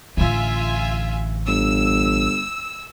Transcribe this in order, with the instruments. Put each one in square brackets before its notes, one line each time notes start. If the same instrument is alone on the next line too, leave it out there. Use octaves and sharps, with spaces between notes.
[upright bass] A1 D3 [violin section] F4 E5 G#5
[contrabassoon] G1 [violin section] E6